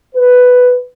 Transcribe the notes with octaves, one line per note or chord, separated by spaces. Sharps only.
B4